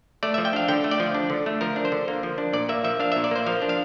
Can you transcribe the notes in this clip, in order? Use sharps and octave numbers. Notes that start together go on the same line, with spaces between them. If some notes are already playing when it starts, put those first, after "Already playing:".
A3 D5
F3 E5
G5
D4 F5
D3 G5
A3
D5
F3
D4
D3
A3
F3 A#4
D4
C5
D3
A#3
F3
D4
A#2 D5
A#3 E5
F3 E5
D4 F5
A#2 E5
D5
A#3 C5
F3 F5
D4
F5